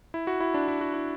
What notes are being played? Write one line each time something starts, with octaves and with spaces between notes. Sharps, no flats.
E4
F#4
E4
D4
E4
F#4
E4